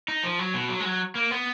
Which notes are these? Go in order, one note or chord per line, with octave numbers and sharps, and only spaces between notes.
D#4
F3
F#3
B2
F#3
G#3
F#3
A#3
B3